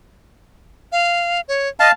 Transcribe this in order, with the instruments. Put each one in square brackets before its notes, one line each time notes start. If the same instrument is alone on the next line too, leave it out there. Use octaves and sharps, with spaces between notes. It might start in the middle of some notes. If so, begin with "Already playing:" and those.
[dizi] F5
C#5
[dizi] D#5 [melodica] F5 A5